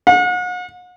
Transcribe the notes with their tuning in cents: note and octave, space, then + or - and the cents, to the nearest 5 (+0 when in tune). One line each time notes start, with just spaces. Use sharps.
F#5 -40